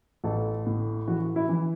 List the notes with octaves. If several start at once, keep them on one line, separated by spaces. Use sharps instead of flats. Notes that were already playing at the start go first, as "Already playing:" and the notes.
A1 A4
A2
E3 F#4
E4
E3